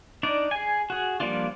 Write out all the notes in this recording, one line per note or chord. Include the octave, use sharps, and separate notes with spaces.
D4 D#4 D5
G#4 G#5
F#4 G#4
F3 G3 A#3 D4 F4